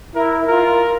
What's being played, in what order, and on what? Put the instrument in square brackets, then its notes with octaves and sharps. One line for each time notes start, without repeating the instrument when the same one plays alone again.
[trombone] E4 [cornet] A#4
[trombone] F4 [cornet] A#4